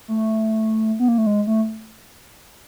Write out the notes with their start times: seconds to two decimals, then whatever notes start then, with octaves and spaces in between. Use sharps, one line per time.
0.08 A3
1.00 B3
1.08 A#3
1.18 A3
1.27 G#3
1.47 A3